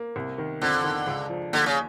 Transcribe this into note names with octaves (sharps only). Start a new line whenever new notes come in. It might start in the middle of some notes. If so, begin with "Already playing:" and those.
Already playing: A#3
C2
D#3
F2 D3
D#3
C#2
F3
D#2 D3
C#3